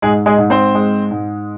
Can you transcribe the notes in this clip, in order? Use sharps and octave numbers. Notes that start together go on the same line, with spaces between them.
G#2 G#3 G#4
G#3 G#4
G#2
C4 C5
G#3
G#2